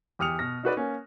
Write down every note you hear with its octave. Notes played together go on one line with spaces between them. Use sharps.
E2 G4 D#6 F6 C#7 F7
B2 F6 A#6
D#4 F#4 B4 D5
A#3 C#4